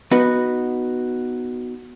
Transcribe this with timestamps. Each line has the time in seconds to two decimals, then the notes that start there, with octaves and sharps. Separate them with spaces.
0.11 B3 D#4 F#4 B4